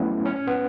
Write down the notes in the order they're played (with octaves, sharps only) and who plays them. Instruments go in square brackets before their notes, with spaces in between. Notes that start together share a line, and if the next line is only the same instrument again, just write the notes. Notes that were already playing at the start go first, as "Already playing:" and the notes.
Already playing: [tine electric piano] F#3 A3 B3 C#4 E4
C#4
C#4
B3